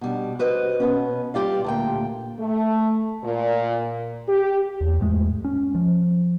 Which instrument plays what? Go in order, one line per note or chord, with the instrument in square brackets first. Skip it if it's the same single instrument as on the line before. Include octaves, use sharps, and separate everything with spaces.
[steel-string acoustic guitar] B2 G3 D4
F#4 B4 C5 D#5
B2 B3 C#4
G3 F4 G4 D5 F5
D2 A#2 G5
[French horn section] A3
A#2
G4
[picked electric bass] E2
E2 G#2 G#3 A3
C#4
F3